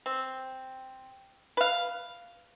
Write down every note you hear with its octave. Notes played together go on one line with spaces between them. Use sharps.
C4
B4 F5